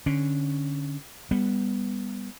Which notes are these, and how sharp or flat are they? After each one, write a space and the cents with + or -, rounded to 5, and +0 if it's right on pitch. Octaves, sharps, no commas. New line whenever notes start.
D3 +0 C#4 +0
G3 +30 B3 +0